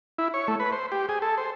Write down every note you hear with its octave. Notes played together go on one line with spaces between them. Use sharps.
E4
C#5
A3
B4
C5
G4
G#4
A4
C5